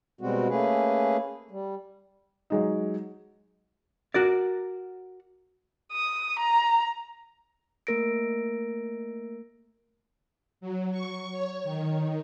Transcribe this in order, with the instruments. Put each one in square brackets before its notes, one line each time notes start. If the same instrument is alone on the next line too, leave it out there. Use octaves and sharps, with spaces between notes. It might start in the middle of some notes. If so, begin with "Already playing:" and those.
[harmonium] B2 G3 G#3 C4 F#4
A3 A#3 C#4 G#4 B4
G3
[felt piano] F#3 G#3 D#4
[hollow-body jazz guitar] F#4 A#4 D5
[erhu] D#6
A#5
[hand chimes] A3 A#3 A#4 A#6 D7
[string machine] F#3
C#6
C#5
D#3